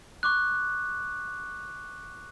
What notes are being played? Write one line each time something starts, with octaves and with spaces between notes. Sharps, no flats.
C#6 D6 F#6